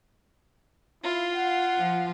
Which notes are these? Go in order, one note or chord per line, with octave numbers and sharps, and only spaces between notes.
E4 F4 F5
F#5
F3